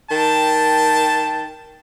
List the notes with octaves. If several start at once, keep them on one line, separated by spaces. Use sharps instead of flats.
D#3 G5 A5